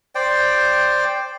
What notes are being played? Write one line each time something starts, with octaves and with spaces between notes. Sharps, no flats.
C5 D5 G5